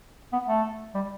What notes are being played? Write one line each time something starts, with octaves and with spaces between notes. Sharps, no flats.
B3
A3
G3